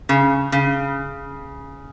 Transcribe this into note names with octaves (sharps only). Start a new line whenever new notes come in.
C#3
C#3